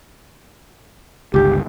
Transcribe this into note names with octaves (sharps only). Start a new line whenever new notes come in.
G1 C#2 G4